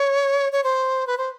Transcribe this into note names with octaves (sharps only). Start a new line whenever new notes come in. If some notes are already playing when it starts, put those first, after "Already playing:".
Already playing: C#5
C#5
C5
B4
C5